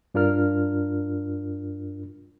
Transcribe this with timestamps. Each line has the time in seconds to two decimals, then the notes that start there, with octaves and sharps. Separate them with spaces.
0.14 G2 D4 F4 A#4 F6